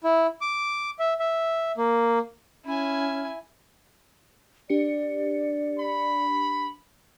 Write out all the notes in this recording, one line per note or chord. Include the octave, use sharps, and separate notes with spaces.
E4
D6
E5
E5
A#3
C#4 E4 G#5
D4 G4 D5 C#7
B5